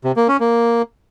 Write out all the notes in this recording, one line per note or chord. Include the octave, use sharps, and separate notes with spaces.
C3
A#3
C#4
A#3